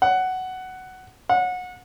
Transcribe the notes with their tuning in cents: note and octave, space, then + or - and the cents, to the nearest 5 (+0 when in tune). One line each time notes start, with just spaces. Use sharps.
F#5 +10
F#5 -25